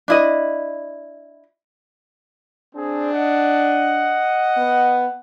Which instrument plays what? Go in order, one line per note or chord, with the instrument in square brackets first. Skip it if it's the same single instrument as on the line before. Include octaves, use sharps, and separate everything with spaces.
[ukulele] D4 E4 D#5
[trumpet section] C4 G#4 [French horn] D4
[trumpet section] D#5 F#5
[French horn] B3